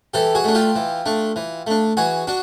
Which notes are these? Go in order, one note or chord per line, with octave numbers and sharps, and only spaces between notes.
E3 G4 A4
F#4 G#4
A3 D4
F4 G4
E3
A3 D4
E3
A3 D4
E3 F#4 G#4
D4 F#4